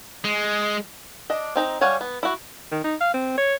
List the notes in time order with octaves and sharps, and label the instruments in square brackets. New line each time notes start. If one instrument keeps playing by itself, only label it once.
[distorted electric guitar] G#3
[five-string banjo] D4 D#5
C4 D#4 A#5
G3 C#5 F5 F#5 G#5
B3
E4 F#4
[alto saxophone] D#3
D#4
F5
C4
C#5